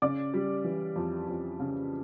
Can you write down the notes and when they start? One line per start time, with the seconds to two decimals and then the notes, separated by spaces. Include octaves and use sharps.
0.02 C#3 D5 D6
0.34 G3
0.64 E3
0.96 F2
1.28 F2
1.60 C#3